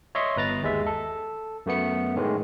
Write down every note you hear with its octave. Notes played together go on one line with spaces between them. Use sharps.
C#5 D#5 E5 C6 C#6
G1 B4 A#5 A6
D#2 G#3 E5
A4
F#2 A3 B3 C#7
A2 D#3 E3 G#3